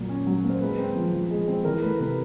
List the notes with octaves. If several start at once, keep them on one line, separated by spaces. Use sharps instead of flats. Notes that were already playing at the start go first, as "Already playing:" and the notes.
Already playing: A#2 F#3 A#3
C#4
F#3
A#3
C5
G#3 B4
C4
F3
F3
G#3
C4
E3 A#4
A3 B4
C3 B4